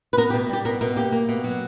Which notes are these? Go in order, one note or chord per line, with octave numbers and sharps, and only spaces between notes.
B4
B3 A#4
G4
B2
G3 G4
B2 A#4
B2 A#4
A#3 G4
A#3
B2
F#3